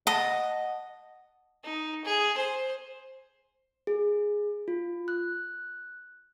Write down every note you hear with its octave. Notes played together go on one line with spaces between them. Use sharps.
D#5 F#5 A5
D#4
G#4
C5
G#4
F4
F#6